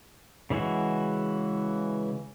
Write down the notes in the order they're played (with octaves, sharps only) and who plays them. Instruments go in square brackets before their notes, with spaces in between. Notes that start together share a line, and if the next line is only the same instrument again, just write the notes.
[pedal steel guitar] C#3 E3 G#3 E4 F#4